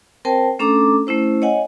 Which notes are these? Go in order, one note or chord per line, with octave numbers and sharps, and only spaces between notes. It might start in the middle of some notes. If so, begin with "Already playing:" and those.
C4 A#4 C5 G5 A5
A3 C#4 D4 A4 A#5 D6
A3 C#4 E4 C5
C#5 D#5 F#5 G#5